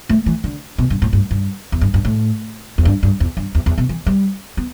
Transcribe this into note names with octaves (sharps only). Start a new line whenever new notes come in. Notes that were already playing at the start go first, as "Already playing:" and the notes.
A3
E3
D3
B2
G2
A2
G2
G2
E2
G2
G2
A2
E2
G2
G2
E2
G2
E2
E2
B2
E3
G3
B3